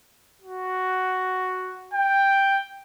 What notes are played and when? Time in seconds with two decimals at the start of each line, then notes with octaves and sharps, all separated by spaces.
0.42 F#4
1.94 G5